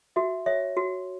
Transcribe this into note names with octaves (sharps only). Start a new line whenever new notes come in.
F#4 E5
C#5 E5
F#4